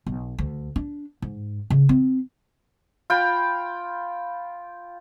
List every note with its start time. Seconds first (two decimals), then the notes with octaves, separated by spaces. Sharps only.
0.07 B1
0.39 D2
0.76 D4
1.22 G#2
1.70 C#3
1.89 C4
3.10 F4 G5 B5